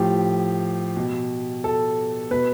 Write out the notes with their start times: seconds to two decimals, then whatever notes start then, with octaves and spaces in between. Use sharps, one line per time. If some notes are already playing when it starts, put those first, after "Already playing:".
Already playing: A2 F3 G4
0.97 B2
1.64 A4
2.31 B2 B4